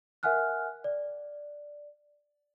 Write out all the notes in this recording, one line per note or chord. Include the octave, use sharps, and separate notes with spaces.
A#4 E5 F#5 G#5 F6 F#6
D5